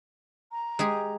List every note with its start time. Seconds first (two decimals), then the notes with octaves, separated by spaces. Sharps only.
0.51 A#5
0.79 G#3 G4 G#4